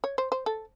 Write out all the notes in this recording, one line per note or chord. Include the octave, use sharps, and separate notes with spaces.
C#5
C5
C5
A4